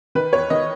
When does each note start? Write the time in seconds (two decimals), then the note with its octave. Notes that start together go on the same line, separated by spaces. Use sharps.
0.15 D#3 B4
0.33 E2 C#5
0.50 D#3 D#5